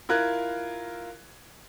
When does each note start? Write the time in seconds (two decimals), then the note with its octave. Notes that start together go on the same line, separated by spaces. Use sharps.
0.09 E4 F4 A#4 F#6 G#6